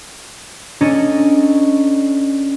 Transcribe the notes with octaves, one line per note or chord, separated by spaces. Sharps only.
C#4 D4 A4 C#5 D#5 A#5